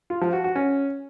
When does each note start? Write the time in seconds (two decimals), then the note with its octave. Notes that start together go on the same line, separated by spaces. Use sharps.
0.10 F4
0.21 F3
0.33 F#4
0.44 F#4
0.56 C#4